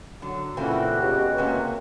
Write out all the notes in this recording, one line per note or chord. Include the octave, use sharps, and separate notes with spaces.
D3 F#3
A#2 C#3 E3 A3 A#3 C4 F#4
C#2 B2 G4
C3 A#3 C#4